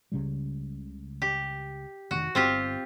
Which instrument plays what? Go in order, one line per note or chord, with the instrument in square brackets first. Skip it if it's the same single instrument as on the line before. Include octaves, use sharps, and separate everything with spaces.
[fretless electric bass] C#2 C#3 G3
[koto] G4
[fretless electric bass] F1 A#2 D#3 [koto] F#4
[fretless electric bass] G1 [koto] C4 F4 G4